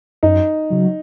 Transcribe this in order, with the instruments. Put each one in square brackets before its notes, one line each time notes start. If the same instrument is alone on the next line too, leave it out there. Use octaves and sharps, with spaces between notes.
[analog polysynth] F#2 [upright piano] D#4
[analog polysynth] C#3 F#3